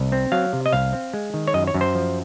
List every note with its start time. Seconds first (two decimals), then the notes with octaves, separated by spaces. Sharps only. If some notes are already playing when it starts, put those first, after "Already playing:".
Already playing: C2
0.12 C4
0.32 F#3 F5
0.53 C3
0.66 D#5
0.72 C2 F5
0.93 C4
1.14 G#3
1.34 D#3
1.48 C#5
1.54 F#2 D#5
1.67 C#5
1.74 F#2
1.81 C5
1.95 F3